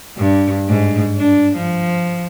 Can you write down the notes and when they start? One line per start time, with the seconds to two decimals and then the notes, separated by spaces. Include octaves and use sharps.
0.17 G2
0.69 G#2
1.17 D4
1.56 F3